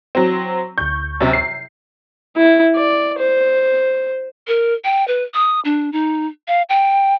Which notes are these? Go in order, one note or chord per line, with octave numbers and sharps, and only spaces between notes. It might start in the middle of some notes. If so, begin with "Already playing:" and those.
F#3 C4
D2 C#6 G6
F#2 C3
C7
E4
D5
C5
A#4
G5
B4
D#6
D4
D#4
F5
G5